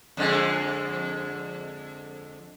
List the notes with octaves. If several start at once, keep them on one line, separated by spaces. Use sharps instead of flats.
F2 D3 G#3